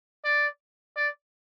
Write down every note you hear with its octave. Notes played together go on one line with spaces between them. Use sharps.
D5
D5